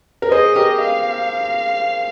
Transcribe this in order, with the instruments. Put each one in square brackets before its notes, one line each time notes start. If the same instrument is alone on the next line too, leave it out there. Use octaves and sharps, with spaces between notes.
[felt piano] A#4
[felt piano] G#4 C5 [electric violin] D#5
[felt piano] G4 A#4
[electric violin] F5